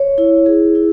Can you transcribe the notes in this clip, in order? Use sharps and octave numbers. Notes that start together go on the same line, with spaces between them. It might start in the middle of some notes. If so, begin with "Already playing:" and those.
Already playing: C#5
E4
G#4
E4